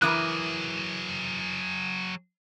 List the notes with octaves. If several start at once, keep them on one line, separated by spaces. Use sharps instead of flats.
E3 F#3 E4 G#4 A#4 D6 D#6 F#6